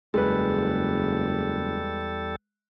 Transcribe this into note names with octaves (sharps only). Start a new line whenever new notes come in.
F#1 E2 G3 G#3 A4 B4